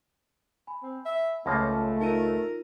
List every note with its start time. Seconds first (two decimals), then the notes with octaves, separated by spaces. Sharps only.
0.67 G#5 B5
0.82 C4
1.06 E5
1.46 C#2 F3 A3 A#3 C#4 B5 A#6
2.01 D#4 F4 A#4 D#7